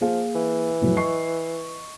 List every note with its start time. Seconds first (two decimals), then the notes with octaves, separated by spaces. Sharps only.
0.01 F3 A#3 G#4 F5
0.35 E3
0.81 F2 A2 F#3
0.97 D#5 C#6 C7